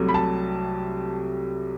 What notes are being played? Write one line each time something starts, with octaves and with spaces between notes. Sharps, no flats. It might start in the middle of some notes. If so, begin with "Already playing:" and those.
Already playing: C2 C3 F#3 A3
B5
A5